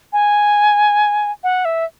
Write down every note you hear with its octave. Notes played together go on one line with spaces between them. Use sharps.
G#5
F#5
E5